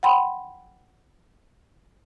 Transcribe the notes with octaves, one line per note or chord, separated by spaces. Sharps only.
F#5 G5 B5 C6